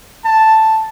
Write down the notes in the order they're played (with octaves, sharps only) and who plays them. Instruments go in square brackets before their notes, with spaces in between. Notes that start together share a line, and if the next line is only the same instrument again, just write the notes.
[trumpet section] A5